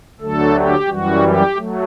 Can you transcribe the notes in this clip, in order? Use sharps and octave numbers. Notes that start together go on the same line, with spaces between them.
D2 D3 F#3 A3 A4
G4
F#2 E3 G3 F#4
G4
F#3 A3